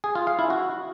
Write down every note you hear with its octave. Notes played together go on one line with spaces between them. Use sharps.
G#4
F4
F5
E4
F#4